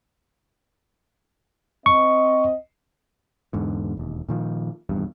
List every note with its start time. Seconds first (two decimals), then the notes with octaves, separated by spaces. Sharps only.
1.86 C4 D#5 C#6
3.53 E2 G#2 D3
3.97 E1 D#2
4.29 A#2 D#3 F3
4.89 D#1 E2 G2